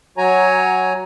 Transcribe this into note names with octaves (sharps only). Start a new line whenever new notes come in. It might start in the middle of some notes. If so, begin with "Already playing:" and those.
F#3 F#4 C#5 G#5 A#5